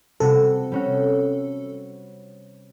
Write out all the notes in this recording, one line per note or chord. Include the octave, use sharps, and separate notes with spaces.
C3 G3 F#4 A4
G3 C#4 F#4